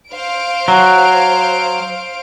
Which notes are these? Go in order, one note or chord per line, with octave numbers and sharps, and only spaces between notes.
C5 F5 D7
F#3